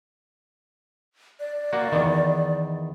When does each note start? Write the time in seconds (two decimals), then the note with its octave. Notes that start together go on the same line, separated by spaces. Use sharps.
1.40 D5
1.73 A#3 F#4
1.92 E2 D#3